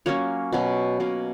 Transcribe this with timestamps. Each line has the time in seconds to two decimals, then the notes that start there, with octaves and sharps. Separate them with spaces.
0.06 F#3 A#3 C#4 C#5
0.53 B2 F#3 C#4
1.00 B2 A#3 C#4